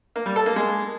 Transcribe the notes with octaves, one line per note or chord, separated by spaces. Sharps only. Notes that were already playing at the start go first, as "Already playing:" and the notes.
A#3
G3
A4
A#3
G#3